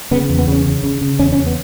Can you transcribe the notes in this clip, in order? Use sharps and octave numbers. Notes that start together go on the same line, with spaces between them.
C#3 B3
E2
B3
C#3 C#4
C#3
C#3
C#3
E2 C#4
C#4
E2
B3